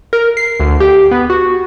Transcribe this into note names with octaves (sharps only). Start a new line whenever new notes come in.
A#4
C7
D2
G4
B3
F#4